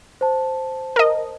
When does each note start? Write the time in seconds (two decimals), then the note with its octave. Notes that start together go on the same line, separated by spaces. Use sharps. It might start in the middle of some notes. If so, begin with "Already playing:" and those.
0.21 C5 A5
0.96 A#4 D#5